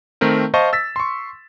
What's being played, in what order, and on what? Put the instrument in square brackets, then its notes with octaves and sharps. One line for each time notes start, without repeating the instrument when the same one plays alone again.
[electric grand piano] D#3 A3 C4 A#4
C5 D#5 F5 A5 C#6
E6 A6 B6
C6 C#6